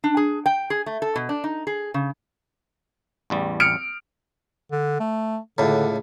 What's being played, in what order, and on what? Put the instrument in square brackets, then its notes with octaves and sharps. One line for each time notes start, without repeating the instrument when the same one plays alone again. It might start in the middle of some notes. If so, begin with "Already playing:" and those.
[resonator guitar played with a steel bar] D4
G#4
G5
G#4
A3
A4
B2
D4
D#4
G#4
C#3
[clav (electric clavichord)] A1 E2 G3
[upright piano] F6 C#7 D7
[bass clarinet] D3
A3
[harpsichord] C#2 A2 [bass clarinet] D3